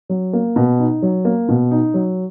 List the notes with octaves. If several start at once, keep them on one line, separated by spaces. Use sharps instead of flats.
F#3
A#3
B2
D#4
F#3
A#3
B2
D#4
F#3